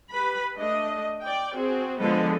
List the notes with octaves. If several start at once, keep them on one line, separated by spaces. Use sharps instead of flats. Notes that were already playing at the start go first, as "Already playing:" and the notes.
G4 B4 B5
A3 D4 D#5
D5 G5
C4 F#4 G#4
D3 F3 G#3 B3 A4 D#5